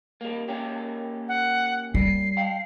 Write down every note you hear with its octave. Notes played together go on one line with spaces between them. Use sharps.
G3 A#3
A#3 C#4 G4
F#5
G3 C7
F5 G5